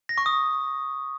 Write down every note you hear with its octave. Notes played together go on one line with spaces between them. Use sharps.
A#6
C#6
D#6